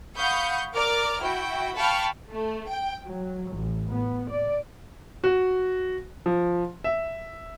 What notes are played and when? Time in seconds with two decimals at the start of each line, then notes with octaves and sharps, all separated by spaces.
0.17 F5 F#5 B5 C#6 D#6 G6
0.75 A#4 D5 D6 F6
1.22 E4 F#4 G5
1.77 F5 G5 A5 B5 C#6 F6
2.30 A3
2.68 G5
3.06 F#3
3.53 A1
3.91 B3
4.30 D5
5.24 F#4
6.26 F3
6.84 E5